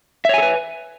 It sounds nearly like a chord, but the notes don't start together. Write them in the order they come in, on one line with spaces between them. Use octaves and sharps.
E5 C#5 G#5 A4 B4